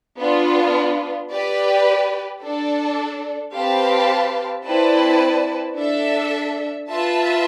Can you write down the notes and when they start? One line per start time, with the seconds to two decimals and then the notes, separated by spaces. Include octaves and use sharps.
0.19 B3 D4 F4
1.31 G4 B4 D5
2.43 D4 A4 D5
3.54 C4 G4 B4 F5 A5
4.65 C4 E4 B4 D5 A5
5.76 D4 A4 E5
6.88 F4 B4 E5 A5